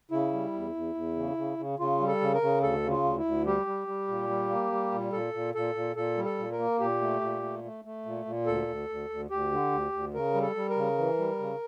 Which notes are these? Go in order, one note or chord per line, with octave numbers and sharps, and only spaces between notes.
C#3 E4
G3
E2
E2
E2
C#3
C#3
C#3
C#3 F4
G3
A4
C#3
A#4
C#3
D2 A4
C#3
F4
D2
E4
D2
G3 G4
G3
G3
A#2
G3
A#3
G3
A#2
A#2 A4
A#2
A#2 A4
A#2
A#2 A4
G3
A4
A#2
A#4
A#3
A#2 G4
A3
A#2
A3
A3
A3
A#2
A#2
D2 A4
D2
D2
D2
D2 G4
D3
D2
D2
C#3 A#4
G3
A4
G3
A#4
C#3
E3
G3
C#3